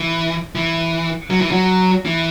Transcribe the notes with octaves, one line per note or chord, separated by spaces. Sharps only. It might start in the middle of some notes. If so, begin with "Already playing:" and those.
Already playing: E3
E3
F#3
E3
F#3
E3